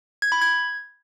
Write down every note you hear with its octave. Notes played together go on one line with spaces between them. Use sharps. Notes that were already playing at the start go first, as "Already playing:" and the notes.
G#6
B5
G#6